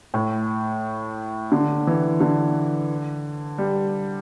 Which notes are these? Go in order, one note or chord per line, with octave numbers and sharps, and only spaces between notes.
A2
D3
E3
D3
G3